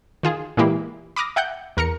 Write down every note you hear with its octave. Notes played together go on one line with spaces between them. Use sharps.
D#3 F4 G#4
A#2 E3 G#3 A#3 E4 G4
B5 D6 D#6 F6 A#6
E5 F#5 G5 F#6 G6
E2 A#4 A#5 C#7